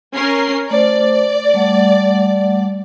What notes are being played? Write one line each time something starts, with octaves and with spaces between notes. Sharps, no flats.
C#4 A#4 C7
A3 C5 D5
G3 A3 F#5